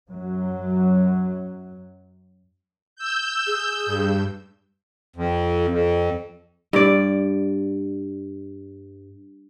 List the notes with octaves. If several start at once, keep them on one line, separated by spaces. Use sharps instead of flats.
F#2 F#3
E6 G6
G#4
G2
F2
F2
G2 D5